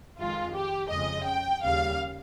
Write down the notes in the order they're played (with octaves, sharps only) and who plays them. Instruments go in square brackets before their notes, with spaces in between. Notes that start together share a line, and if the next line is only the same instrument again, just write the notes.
[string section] F2 D#3 G#3 F4
G4
F2 C#3 G#3 D#5
G5
D#2 C#3 G3 F5